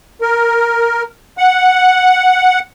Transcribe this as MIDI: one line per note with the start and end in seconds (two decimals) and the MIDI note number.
0.21 1.03 70
1.38 2.60 78